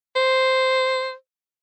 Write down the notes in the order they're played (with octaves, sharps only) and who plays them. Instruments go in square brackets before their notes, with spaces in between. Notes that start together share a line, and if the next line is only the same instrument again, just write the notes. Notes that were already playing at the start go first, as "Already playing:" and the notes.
[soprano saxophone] C5